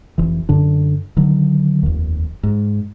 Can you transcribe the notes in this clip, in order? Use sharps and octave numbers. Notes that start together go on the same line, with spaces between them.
F1 E3
F#2 D3 D4
D3 D#3 F#3
F1 D#2
G#2